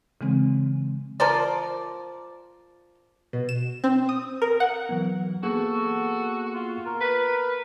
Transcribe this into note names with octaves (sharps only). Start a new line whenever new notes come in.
C#3 E3 G#3 C4
F3 A#4 C5 D5
B2
E7
C4
D#6
A#4
F#5
E3 F#3 B3
A#3 B3 F#4 G#4 A4
F4
A#4
B4